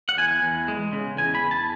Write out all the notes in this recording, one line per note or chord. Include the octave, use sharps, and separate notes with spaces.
F#5
E2 G#5
E2
G#3
C#3
E2 G#5
B5
E2
A5